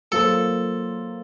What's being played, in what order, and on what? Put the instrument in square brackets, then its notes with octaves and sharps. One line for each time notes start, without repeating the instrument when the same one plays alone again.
[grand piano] F#3 A#3 F4 C5 [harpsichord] A4